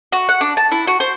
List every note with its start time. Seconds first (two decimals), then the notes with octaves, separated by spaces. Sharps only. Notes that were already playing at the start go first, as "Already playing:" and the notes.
0.12 F#4
0.29 F#5
0.41 D4
0.57 A5
0.72 E4
0.87 F#4
1.00 C5